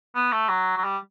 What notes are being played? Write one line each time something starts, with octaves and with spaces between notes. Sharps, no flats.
B3
A3
F#3
F#3
G3